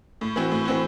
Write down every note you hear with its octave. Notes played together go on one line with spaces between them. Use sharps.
A2
E3 C4 F#4
A2
E3 C4 F#4